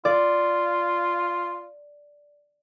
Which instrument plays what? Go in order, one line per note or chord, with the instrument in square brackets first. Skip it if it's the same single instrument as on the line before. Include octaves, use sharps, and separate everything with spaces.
[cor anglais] F4 [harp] D5